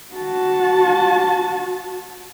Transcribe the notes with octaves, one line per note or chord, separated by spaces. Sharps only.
F#4 A5